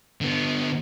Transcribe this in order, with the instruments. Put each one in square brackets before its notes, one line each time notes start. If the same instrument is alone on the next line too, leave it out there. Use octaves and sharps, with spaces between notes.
[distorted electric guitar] D3 B3